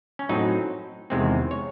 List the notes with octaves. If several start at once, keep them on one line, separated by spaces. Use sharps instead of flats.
C#4
A2 F#3 C4 D#4
E2 C3 D#3 G#3 C4
C#5